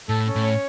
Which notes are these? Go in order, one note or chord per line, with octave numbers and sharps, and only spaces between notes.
A2 A4
C#4
A2
C#5